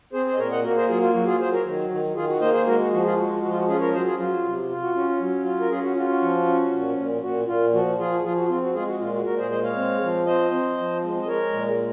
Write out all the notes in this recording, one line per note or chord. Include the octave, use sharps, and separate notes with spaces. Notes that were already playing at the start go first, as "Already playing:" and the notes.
C4 G#4 C5
G#4 C5
D#5
A#2 A#4 C#5
D#5 F#5
A#3 F#4 A#4
G#4 C5
F#3 F4 G#4
F4
F#3 F#4
F4 G#4
F#3 G#4 C5
A#4 C#5
D#3
D#3
D#3 F4 G#4
F#4
A#3 C5 D#5
G#4 C5
G#3 F#4 A#4
F#4
F3 F#4
F4 G#4
G#3 F#4
F3 F#4
F4
F#4
C#4 F4 G#4
A#4 C#5
F#3 G#4 C5
F4 G#4
F#3 F4
C3
F4
F#4
C#4 F#4
F#3
F4
A#4
C#4 F4 G#4
F#4
F4 F#4
F#4
F3
C#4
A#2
A#2
A#2 F#4
A#2 F4
F3 F#4
F3 F4 G#4
F3 F4 G#4
F#4
C4 F4
F#4
G#3 F4 G#4
F#4
A#2 F4
F#4
A#2 F#4 A#4
G#4 C5
G#3 C5 D#5
C#5 F5
C4
F3
C4 C5 D#5
C4
F3
G#3
D#5
G#3 A#4 C#5
A#2